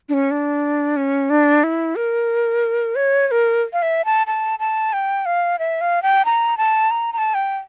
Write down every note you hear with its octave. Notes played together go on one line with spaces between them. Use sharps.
D4
C#4
D4
C#4
D4
E4
A#4
C#5
C#5
A#4
F5
E5
A5
A5
A5
G5
F5
E5
F5
G5
A#5
A5
A#5
A#5
A5
G5